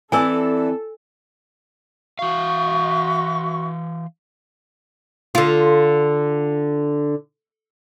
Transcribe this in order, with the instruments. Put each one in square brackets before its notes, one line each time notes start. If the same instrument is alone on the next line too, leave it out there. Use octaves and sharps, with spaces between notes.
[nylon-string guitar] E3 D5 [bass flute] C4 [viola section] A4 [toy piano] G#5 A5 E6
[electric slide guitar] E3 F5 [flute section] F#4 E5 C#6
[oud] D3 F4